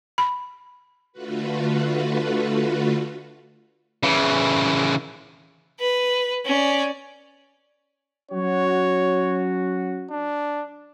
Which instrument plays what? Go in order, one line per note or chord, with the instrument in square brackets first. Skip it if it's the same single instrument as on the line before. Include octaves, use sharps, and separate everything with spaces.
[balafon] B5
[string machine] D3 A3 F4 F#4 B4
[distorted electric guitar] C#3 E3
[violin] B4
C#4 D5
[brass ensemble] F#3 C#4 F#4 [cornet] C#5
[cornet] D4